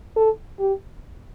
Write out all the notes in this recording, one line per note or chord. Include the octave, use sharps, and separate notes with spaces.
A4
G4